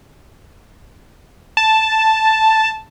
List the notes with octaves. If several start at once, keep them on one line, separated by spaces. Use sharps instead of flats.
A5